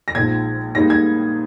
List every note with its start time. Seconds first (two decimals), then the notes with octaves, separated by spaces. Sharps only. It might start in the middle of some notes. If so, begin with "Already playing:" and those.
0.08 A#6
0.15 A#1 G#2 F3 G#6
0.75 G#2 G3 A#3 D#4 A#6
0.90 G#6